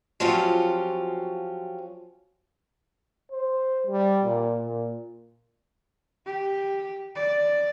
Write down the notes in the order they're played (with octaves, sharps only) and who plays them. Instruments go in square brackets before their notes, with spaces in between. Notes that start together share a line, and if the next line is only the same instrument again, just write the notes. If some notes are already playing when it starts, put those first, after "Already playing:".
[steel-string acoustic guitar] F3 F#3 C4 C#4 F4 G4
[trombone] C5
G3
A#2
A#2
[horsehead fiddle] G4
D5